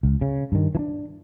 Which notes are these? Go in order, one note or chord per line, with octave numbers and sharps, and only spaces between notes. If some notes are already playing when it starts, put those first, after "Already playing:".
C#2
C#3
G2 D#3
E3 D4